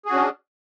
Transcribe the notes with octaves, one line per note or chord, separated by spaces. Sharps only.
C#4 D4 F#4 G#4